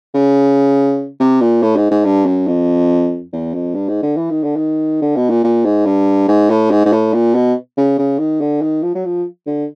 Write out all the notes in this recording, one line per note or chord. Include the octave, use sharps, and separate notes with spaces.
C#3
C3
A#2
A2
G#2
G#2
G2
F#2
F2
E2
F2
G2
G#2
D3
E3
D#3
D3
D#3
D3
B2
A#2
A#2
G#2
G2
G#2
A2
G#2
G#2
A2
A#2
B2
C#3
C#3
D#3
D3
D#3
F3
F#3
F3
D3